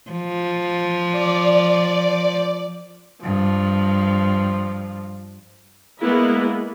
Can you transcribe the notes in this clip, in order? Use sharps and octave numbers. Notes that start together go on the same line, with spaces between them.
F3
D5
G2 F3
G#3 A#3 B3 E4